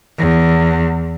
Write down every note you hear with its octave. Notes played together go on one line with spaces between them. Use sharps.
E2